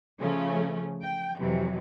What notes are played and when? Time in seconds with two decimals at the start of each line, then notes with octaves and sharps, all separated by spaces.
0.20 C#3 F3 A3 C#4
1.03 G5
1.39 F2 C3 E3 F#3